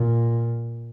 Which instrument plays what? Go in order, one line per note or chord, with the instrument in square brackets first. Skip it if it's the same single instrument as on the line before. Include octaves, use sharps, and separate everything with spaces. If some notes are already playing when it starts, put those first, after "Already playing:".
Already playing: [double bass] A#2